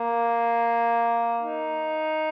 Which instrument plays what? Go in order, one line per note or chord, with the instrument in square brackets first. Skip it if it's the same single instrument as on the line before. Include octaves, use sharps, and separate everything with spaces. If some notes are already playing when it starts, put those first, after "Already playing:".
Already playing: [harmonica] A#3
D#4